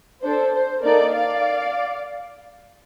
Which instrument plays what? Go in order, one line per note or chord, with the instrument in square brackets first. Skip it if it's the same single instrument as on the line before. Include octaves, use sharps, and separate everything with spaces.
[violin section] D4 A4 C5
C5
A#3 D#4 A4 A#4 D5
D5 F5